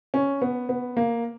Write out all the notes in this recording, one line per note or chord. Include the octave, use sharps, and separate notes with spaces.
C#4
B3
B3
A#3